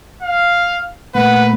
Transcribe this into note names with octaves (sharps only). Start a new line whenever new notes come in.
F5
A#2 A3 A#3 B4 F#5